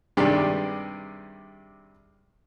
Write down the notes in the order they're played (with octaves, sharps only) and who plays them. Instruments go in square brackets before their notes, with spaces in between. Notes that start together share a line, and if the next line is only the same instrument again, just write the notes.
[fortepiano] G2 C3 D#3 G#3 G4 D5